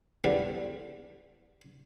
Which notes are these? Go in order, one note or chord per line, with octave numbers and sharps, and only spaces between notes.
E2 D3 G3